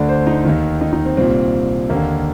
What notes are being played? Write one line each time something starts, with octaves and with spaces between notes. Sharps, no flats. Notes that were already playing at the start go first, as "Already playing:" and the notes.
Already playing: D2 D3 D5
C5
D#4
D#2 D#3
D#4
D#4
C4
C2 A#2 C4
D#2 D3 A#3